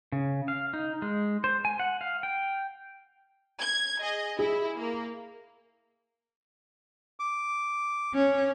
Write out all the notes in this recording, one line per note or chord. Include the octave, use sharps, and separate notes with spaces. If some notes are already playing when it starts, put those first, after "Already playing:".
C#3
F5
D#4
G#3
C5
G#5
F#5
F5
G5
G#6
G#4 D#5
E4 G#4
A#3
D6
C#4